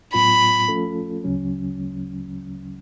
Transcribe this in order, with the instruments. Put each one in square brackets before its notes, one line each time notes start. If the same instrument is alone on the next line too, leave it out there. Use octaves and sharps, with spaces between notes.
[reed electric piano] A2 F#3 B3 F4 [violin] B5
[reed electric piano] F3 A3 C#4 F4 A4
D2 C#3 F#3 C#4